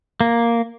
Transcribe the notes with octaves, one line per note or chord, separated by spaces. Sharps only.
A#3